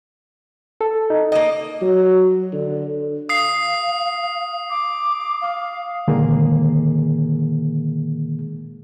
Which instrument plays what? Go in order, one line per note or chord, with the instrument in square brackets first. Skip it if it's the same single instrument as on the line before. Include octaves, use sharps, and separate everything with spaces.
[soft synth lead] A4
D#4
[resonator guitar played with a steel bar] A#3 D#5
[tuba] F#3
D3
[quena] F5 [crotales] D#6 C7
[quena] D6
F5
[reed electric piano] A#2 D3 D#3 G#3 A#3 G#4